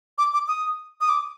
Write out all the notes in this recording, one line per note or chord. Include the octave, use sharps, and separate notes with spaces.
D6
D6
D#6
D#6
D6